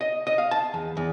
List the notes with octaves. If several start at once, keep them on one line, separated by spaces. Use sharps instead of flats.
D#5
D#5
F5
A5
E2
E2